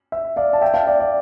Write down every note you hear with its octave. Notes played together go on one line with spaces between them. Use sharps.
E5
D5 F5
A5
E5 G5
F5 A5
D5 F5
D5